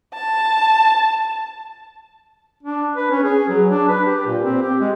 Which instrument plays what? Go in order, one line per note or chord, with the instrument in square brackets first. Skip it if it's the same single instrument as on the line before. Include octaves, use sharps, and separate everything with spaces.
[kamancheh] A5
[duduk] D4
B4
C#4
G#4
F#3
D4
B4
G4
A#2
C4
G4
G#3